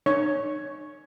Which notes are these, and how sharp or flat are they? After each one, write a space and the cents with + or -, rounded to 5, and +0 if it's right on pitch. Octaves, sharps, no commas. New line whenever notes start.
D#4 -35 C#5 +5